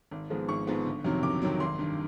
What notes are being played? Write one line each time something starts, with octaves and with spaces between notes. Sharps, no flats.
G#1
G#2 F3 G#3 B3
G#1 C#6
G#2 F3 G#3 B3
G1
F2 C3 D#3 F#3
G1 D6
F2 C3 D#3 F#3
G#1 C6
G2 D#3